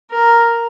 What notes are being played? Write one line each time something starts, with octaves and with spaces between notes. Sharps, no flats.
A#4